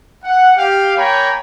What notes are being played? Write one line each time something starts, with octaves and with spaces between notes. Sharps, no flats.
F#5
G4 F5 G5
A#3 C#5 G5 G#5 A#5 B5